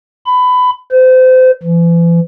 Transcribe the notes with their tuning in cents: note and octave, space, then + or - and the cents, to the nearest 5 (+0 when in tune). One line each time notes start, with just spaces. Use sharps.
B5 +20
C5 -30
E3 +40